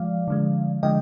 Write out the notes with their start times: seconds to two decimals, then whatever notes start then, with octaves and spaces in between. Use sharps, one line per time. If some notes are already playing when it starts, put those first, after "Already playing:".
Already playing: F3 G#3 D5 F5
0.28 D3 F3 G#3
0.83 D3 F3 G#3 D#5 G5